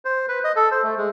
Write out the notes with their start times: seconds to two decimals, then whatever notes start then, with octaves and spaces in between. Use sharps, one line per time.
0.05 C5
0.29 B4
0.44 D#5
0.56 A4
0.71 C5
0.83 A3
0.98 G#3